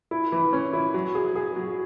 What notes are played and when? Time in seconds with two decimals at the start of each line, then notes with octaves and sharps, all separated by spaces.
0.11 E4
0.32 E3
0.53 C#4
0.73 E4
0.94 F#3
1.15 G#4
1.35 G#4
1.56 F#3